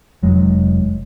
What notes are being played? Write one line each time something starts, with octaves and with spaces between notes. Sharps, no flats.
F1 F#3 G#3